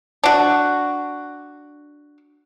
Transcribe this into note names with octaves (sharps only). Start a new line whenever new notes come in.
D4 F#4